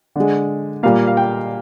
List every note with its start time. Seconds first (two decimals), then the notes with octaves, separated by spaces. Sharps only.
0.16 D3 G#3
0.83 A#2 G3 A#3 F5
1.07 F5
1.17 G5